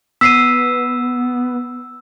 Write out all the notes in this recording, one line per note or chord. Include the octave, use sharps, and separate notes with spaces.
B3 E6 B6 C7 D#7